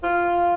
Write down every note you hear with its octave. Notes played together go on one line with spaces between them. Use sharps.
F4